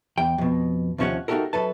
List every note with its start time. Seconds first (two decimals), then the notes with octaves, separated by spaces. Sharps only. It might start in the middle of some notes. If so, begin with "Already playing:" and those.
0.18 E2 G5
0.38 F2 B2
0.98 D#2 C3 F3 C#4 C#5 F#5
1.28 A3 D#4 F#4 G4 A4 A#4
1.53 F#2 A4 B4 A5